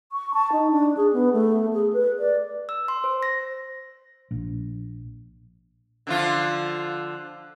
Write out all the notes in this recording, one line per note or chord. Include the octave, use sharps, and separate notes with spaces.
C#6
A5
D#4
D4
G#4
B3
A3
G#4
B4
D5
E6
C6
C5
A#6
A#1
D3 F3 F4